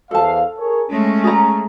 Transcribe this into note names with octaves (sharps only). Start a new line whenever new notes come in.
E2 A4 C5 F5 A5
G#4 A#4 C#5
G#3 A3 C#4
G#4 A#5